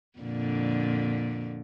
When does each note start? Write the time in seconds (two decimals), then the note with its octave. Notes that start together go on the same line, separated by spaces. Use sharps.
0.19 F2 A#2 D3